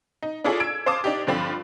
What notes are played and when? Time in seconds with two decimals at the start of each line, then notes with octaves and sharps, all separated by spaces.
0.23 D#4
0.44 D4 E4 F4 G#4 A4 C#5
0.60 E6 G#6 D7
0.86 C5 F5 A5 D6 D#6
1.04 D4 D#4 G4
1.27 G2 D3 F3 C4 F4 B5